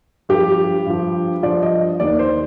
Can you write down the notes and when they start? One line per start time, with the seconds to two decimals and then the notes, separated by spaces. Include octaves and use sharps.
0.29 G2 F3 G4
0.86 G2 F3
1.43 G2 F3 D5
1.62 D#5
2.00 D#2 D#3 D5
2.19 C5